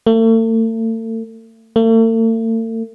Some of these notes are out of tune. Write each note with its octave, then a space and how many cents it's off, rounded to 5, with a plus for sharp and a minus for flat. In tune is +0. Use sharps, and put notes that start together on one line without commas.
A3 +40
A3 +45